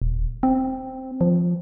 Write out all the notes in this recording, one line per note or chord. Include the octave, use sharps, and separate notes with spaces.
D#1
C4
F3